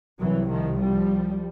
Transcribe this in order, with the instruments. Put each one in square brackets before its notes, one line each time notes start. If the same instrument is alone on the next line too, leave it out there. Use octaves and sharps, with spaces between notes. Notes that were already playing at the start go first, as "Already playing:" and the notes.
[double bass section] C2 C3 E3 F#3
D#3 F3
F3 G3